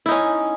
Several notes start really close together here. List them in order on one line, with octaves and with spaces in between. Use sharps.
E4 D#4 C#4